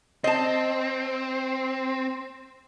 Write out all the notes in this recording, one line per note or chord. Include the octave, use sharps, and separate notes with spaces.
C4 D#5 A5